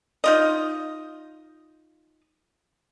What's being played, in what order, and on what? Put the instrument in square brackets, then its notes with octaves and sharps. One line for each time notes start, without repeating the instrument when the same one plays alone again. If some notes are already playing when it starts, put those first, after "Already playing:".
[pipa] D#4 F4 D#5